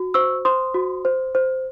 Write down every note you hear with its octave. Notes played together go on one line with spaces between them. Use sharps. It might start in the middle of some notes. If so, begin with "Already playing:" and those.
Already playing: F#4
C5 C#6 E6
C5 C6 D#6
F#4
C5
C5